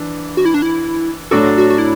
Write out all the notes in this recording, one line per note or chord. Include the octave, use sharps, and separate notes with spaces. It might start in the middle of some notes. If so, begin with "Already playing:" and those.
Already playing: E3 D4
F#4
E4
D4
E4
A2 F#3 D4 F#4 A4
F#4
F#4
E4